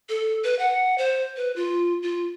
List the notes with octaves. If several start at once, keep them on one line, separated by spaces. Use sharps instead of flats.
A4
B4
F#5
C5
B4
F4
F4